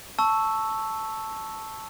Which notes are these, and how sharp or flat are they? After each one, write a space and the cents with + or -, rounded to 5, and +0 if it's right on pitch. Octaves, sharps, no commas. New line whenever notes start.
A5 +0 C#6 +0 E6 +0